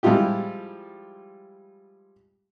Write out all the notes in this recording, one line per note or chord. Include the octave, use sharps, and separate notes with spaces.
F3 G3 G#3 E4 F4 G4